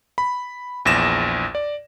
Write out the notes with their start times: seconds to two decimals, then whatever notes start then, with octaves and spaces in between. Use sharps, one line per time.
0.18 B5
0.85 A#1 E2 A#6 E7
1.55 D5